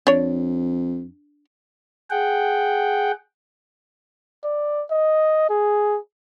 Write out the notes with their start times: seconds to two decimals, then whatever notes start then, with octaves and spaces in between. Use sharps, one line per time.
0.07 F2 D4 C#5
2.10 G#4 F#5 G5
4.44 D5
4.91 D#5
5.49 G#4